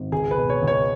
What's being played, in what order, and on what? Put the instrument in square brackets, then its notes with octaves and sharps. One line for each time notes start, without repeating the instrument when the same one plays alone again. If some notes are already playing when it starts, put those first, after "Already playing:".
Already playing: [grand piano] G#1
C#2 G#4
B4
B2
C#5
C#2
C#5